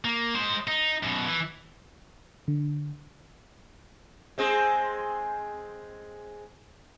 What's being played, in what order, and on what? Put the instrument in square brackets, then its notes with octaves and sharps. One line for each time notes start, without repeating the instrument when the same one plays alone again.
[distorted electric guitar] A#3
G#3 C5
D#4
F#2 B2
E3
[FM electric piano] D3
[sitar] G#3 C4 G#4